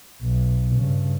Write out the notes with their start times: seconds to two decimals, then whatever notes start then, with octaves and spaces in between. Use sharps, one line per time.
0.21 B1
0.75 G2 C#3